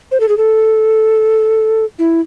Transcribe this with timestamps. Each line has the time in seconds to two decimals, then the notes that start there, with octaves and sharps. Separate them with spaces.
0.11 C5
0.20 A4
0.29 G#4
0.37 A4
1.99 E4